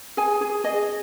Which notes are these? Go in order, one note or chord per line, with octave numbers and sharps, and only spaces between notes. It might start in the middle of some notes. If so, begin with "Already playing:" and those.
G#4 G#5
G#4
G#4 D#5